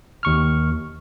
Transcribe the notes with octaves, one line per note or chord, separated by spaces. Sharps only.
D#2 C#6 F6